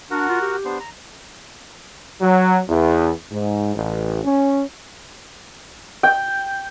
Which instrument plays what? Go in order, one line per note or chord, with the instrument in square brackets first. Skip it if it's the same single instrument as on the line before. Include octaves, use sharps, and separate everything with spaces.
[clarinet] D4 [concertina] F#4 A#4 F#5
[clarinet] F4
G4
[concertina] B3 D4 C5
A#5
[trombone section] F#3
E2
G#2
A1
C#4
[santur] G5